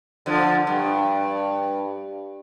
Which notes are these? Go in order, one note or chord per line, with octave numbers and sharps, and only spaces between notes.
D3 F3
G2